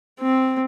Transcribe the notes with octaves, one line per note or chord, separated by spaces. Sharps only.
C4